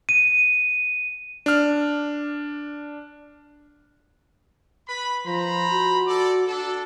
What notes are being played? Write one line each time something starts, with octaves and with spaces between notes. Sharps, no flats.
D#7
D4 F6
B4 B5
F3 C5 A#5 B5
F#4
A4 D5
D4 A4